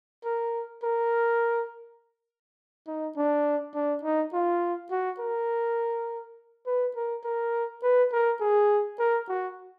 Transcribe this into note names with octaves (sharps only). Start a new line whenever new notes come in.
A#4
A#4
D#4
D4
D4
D#4
F4
F#4
A#4
B4
A#4
A#4
B4
A#4
G#4
A#4
F#4